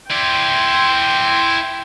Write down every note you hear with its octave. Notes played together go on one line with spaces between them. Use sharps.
E4 D5 G5 C6